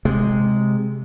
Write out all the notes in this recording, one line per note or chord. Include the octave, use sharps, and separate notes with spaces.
C3 G#3